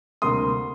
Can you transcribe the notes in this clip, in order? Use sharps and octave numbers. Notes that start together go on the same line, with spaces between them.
D2 C3 G3 A#3 C6 D#6